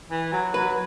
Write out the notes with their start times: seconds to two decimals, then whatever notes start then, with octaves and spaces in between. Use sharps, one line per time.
0.10 E3
0.32 F#3
0.54 F#3 B4